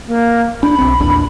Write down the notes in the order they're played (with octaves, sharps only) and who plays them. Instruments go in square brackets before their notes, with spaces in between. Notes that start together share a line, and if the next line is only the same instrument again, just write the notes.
[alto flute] A#3
[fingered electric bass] D4 [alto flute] B5
[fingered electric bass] B1 C4
A#1 E2 D4